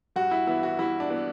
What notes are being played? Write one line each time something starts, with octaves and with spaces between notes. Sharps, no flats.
G2 F#4
E4
E3 B3 E4
F#4
G2 E4
D4
E3 B3